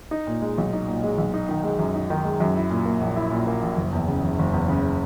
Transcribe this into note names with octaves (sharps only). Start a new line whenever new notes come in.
D#4
A#2
G#3
B1
D#4
A#2
G#3
B1
D#4
D#3
G#3
F#2
D#4
D#3
G#3
F#2
E4
A#2
A#3
A#1
E4
A#2
A#3
A#1
F#1
E2
C#3
F#1
F#1
E2
C#3